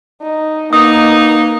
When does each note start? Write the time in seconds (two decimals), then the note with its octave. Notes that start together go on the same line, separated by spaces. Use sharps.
0.22 D#4
0.73 A#3 B3 D#4 D#6